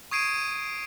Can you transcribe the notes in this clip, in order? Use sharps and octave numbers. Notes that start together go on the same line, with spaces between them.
C#6 D#6 G#6 C7 D7 D#7